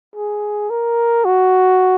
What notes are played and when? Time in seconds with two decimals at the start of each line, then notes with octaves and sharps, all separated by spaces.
0.16 G#4
0.70 A#4
1.25 F#4